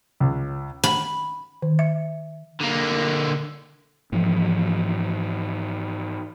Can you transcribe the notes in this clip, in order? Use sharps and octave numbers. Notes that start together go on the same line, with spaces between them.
C#2
B5
D#3
E5
D3 A#3
G#2 E3 F3